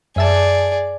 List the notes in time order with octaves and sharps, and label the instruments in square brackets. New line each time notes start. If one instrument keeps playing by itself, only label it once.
[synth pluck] F#2 E5 A5 [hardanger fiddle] G#4 D5